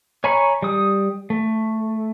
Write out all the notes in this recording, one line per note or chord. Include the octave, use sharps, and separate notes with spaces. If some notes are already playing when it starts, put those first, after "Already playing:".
C#5 G#5 A#5 B5 C#6
G3 D#6
A3